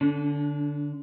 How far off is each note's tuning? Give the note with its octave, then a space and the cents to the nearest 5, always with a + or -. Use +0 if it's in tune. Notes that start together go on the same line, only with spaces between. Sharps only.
D3 +0 D4 -30